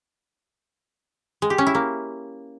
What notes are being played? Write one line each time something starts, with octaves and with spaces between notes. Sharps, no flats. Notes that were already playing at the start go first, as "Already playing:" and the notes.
G#3
G4
C#4
E4
A#3